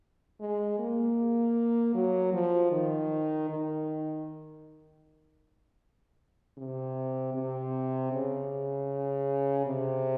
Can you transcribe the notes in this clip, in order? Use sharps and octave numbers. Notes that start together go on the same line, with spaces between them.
G#3
A#3
F#3
F3
D#3
D#3
C3
C3
C#3
C3